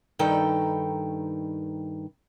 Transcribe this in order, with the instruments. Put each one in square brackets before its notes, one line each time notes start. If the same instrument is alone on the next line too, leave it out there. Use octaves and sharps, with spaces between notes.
[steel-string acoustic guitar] G2 D#3 D#4 A4 G5